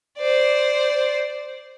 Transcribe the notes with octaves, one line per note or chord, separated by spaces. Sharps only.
C5 D5